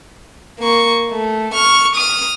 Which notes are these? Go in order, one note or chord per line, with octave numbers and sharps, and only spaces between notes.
A#3 C#6
A3
C#6 F6
D#6 F6